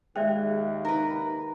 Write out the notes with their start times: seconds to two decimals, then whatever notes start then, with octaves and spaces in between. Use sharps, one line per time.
0.16 D#2 G#3 G#4 D5 E5 G5
0.85 D#4 A#4 B4